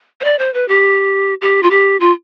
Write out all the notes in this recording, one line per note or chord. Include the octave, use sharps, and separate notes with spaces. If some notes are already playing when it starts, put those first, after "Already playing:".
C5
D5
C5
B4
G4
G4
F4
G4
F4